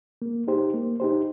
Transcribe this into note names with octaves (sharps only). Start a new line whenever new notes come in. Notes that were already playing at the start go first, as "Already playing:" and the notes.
A#3
D#4 G4 C5
A#3
D#4 G4 C5